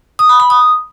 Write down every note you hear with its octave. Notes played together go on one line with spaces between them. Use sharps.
D#6
B5
B5
D#6